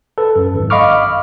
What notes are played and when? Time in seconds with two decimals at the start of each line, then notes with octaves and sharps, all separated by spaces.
0.18 A4 B4
0.36 F#2
0.55 G#1
0.70 D#5 F5 B5 C#6 D6 F6